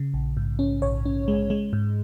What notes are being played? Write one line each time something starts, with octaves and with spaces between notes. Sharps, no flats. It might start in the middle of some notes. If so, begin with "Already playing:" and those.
Already playing: C#3
A#1
G#2
C#4
A#1 C#5
C#4
G#3
G#3
G#2